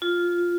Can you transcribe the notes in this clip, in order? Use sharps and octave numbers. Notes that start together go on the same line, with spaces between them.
F4